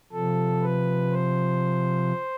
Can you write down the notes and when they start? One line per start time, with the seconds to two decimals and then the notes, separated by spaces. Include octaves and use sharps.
0.12 C3 F3 A4
0.62 B4
1.12 C5